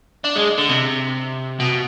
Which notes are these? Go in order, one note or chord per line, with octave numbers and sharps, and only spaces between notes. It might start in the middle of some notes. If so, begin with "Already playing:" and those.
D4
G#3
D3
C3
B2